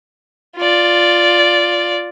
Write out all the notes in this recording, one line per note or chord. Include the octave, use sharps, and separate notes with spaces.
F4 D5